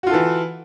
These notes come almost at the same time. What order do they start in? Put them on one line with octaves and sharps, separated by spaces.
F#4 F4 A4 E3